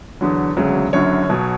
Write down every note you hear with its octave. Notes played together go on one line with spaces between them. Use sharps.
E2 D3 F#3
E1 D2 C#3 F#3
F#1 F#2 D3 F#3 C#5
B1 B2 F#3